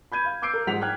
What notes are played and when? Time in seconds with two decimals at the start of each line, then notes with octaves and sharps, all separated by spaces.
0.12 B5 G6 G#6 D#7
0.25 F5
0.42 D6 E6 G6 C7 D7
0.53 A#4
0.67 G#2 F3 F#5 B6 F7
0.81 G5 F6 F#6 G#6